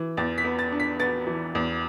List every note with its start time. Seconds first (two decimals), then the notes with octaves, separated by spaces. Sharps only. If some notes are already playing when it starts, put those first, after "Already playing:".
Already playing: E3
0.17 E2 A6
0.38 B6
0.45 B3
0.59 A6
0.72 D4
0.80 B6
1.00 B3 A6
1.27 E3
1.55 E2